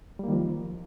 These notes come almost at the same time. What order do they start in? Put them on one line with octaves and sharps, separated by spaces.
G3 A#3 D#3 F3